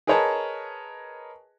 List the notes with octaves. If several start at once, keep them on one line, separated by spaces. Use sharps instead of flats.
G#4 A#4 B4 C#5 D#5 A5